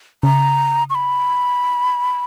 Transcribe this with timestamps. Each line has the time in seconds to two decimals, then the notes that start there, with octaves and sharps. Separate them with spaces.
0.23 C#3 A#5
0.90 C#6
0.95 B5